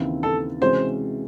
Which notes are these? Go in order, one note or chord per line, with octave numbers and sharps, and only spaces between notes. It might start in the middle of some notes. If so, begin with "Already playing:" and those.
Already playing: D#2 C#3 E3 C4 E4
A4
C3 E3 G#3 C#4 F#4 C5